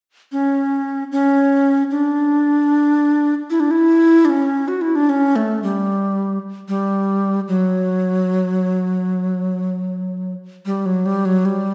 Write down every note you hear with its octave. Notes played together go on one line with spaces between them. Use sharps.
C#4
C#4
D4
E4
D4
E4
D4
C#4
F#4
E4
D4
C#4
A3
G3
G3
F#3
G3
F#3
G3
F#3
G3